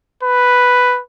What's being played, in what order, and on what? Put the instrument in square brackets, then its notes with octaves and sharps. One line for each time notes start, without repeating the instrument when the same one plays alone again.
[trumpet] B4